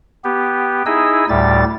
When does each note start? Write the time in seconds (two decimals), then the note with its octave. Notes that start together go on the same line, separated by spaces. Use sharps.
0.24 B3 G4
0.86 D#4 E4 G#4 D#5 E6
1.29 D2 A2 G3 A6